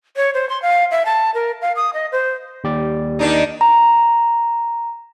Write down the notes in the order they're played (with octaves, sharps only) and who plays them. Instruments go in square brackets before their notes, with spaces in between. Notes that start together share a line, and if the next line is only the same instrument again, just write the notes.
[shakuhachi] C#5
C5
C6
F5
E5
A5
A#4
F5
D#6
D#5
C5
[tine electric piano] D#2 G4 D5
[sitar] D#3 D4 D#4
[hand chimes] A#5